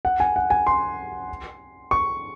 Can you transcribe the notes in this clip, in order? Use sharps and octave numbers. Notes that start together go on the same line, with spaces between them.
F#5
G#5
F#5
G#5
C6
C#6